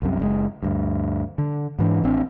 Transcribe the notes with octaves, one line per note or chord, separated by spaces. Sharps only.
C2 F#2 C3
F#1 C3 G#3
D2 G2
D3
G#2 E3 D4
A1 C4 D4